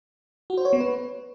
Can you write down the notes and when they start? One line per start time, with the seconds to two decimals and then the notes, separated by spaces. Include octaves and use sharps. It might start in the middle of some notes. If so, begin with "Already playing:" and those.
0.50 F#4
0.57 C5
0.65 C#5
0.73 B3
0.80 B4